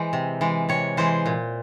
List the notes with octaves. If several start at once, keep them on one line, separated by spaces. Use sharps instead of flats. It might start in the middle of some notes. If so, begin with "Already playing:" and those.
Already playing: E3 G#3 C5
C3
E3 G#3
C3 C#5
E3 G#3 C5
A#2